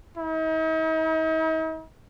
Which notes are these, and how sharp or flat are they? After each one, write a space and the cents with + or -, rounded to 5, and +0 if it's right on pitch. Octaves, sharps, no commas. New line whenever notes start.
D#4 +45